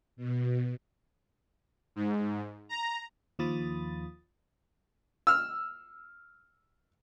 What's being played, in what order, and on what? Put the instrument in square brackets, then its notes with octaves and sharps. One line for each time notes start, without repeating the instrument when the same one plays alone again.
[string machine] B2
[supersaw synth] G#2
A#5
[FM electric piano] D#2 F3 F4 B5 D#6 A6
[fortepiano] E6 F6